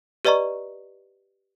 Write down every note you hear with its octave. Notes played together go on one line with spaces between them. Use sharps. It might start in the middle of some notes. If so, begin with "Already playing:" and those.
G4 B4 D5 D#5 A#5 C#6